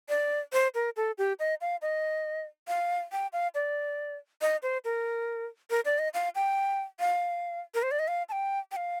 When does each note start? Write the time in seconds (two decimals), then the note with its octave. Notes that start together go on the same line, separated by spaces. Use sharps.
0.09 D5
0.53 C5
0.75 A#4
0.96 A4
1.18 G4
1.39 D#5
1.61 F5
1.82 D#5
2.68 F5
3.12 G5
3.33 F5
3.55 D5
4.41 D#5
4.63 C5
4.85 A#4
5.70 A#4
5.85 D5
5.99 D#5
6.14 F5
6.35 G5
7.00 F5
7.74 A#4
7.83 C5
7.91 D5
7.99 D#5
8.08 F5
8.29 A5
8.32 G5
8.72 G5
8.76 F5